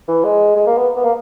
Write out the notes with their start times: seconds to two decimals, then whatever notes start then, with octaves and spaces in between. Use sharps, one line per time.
0.08 E3
0.24 G#3
0.56 G#3
0.67 A#3
0.77 B3
0.96 B3
1.04 A#3